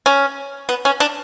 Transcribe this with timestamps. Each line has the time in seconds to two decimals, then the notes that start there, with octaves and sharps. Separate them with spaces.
0.06 C#4
0.69 B3
0.85 C#4
1.00 D4